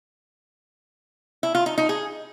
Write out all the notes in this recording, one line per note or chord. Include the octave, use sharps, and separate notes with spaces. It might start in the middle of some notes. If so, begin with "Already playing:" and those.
E4
F4
D#4
D#4
G#4